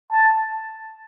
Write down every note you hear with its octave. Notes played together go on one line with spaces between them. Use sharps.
A5